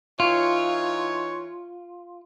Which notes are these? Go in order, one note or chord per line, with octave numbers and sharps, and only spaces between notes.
E3 D#4 F4 C#5